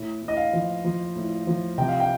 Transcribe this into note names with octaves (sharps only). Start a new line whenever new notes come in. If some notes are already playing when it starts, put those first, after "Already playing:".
Already playing: A2
A2
D#5
F5
F3
F3
A2
F3
C3 G5
F5
G5